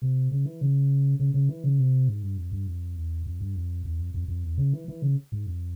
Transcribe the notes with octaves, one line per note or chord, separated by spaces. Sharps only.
C3
C#3
E3
C#3
C#3
C#3
E3
C#3
C3
G#2
G2
F2
G2
F2
E2
F2
G2
F2
E2
F2
F2
F2
E2
C#3
E3
E3
C#3
G#2
F2